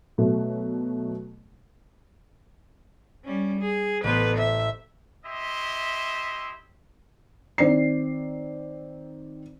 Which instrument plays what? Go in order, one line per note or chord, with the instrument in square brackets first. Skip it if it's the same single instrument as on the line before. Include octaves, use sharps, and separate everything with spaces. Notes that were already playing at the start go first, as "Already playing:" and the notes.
[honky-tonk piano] B2 F#3 A3
[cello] G3 C#4
G#4
[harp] A1 C5 [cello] B3 B4
[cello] E5
[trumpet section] E4 G4 D#5 E5 C6
[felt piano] D#3 C4 D5 C7